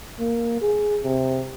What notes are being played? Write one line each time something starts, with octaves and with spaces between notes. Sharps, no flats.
A#3
G#4
C3